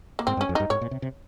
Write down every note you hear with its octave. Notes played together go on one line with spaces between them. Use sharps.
A#3
G#2 C4
G2
C#4
F2
G2 D#4
G#2 C#5
A#2
C3
C3